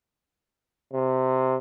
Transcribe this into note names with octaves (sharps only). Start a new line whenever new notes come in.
C3